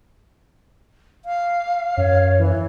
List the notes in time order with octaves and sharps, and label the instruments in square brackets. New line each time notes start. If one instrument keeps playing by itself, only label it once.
[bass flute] F5
[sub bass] F#2 [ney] C#5
[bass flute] E3